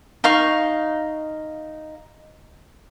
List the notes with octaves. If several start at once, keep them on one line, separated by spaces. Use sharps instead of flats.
D#4 F5 C#6